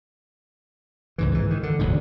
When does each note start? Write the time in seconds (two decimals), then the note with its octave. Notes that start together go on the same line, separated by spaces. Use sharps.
1.18 C#2 G#2 E3
1.32 G#2 E3
1.51 D#3
1.63 D3
1.79 E1 D2 G#2